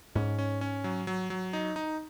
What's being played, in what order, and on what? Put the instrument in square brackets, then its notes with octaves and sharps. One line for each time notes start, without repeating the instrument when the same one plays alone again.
[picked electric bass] G#2 [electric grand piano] C#4
[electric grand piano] C#4
C#4
F#3
F#3
F#3
D#4
D#4